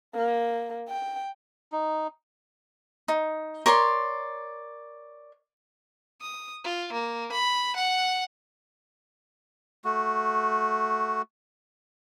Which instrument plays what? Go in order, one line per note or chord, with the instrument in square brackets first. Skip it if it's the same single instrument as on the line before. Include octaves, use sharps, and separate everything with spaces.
[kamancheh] A#3
G5
[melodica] D#4
[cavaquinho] D#4
A#4 C#5 D5 C6
[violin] D#6
F4
A#3
B5
F#5
[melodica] A3 F#4